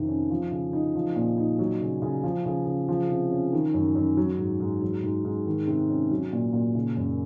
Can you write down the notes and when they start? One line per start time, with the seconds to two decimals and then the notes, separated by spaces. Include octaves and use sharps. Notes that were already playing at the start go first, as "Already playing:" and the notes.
Already playing: F2 C3 D#3
0.08 C#4
0.30 F3
0.51 C#3
0.73 D#4
0.95 F3
1.16 A#2
1.38 D#4
1.59 F#3
1.81 C#3
2.02 C#3
2.23 F3
2.45 C#3
2.66 C#3
2.88 F3
3.10 C3
3.31 C#4
3.53 D#3
3.74 F#2
3.95 F#2
4.17 F#3
4.39 G#2
4.60 G#2
4.82 F#3
5.03 G#2
5.25 G#2
5.46 D#3
5.67 C3
5.89 C#4
6.11 F#3
6.33 A#2
6.53 A#2
6.75 C#3
6.97 F#2